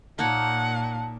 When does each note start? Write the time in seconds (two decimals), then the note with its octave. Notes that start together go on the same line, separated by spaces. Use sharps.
0.19 A#2 A#3 D#4 C#5 F#5 A5